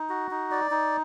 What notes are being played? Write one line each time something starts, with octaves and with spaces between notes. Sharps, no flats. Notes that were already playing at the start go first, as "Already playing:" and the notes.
Already playing: D#4
F#4
D#4
D5
D#4